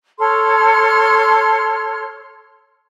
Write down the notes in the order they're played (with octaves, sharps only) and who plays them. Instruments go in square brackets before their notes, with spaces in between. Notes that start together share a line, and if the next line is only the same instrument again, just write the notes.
[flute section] A4 C#5 C6 F6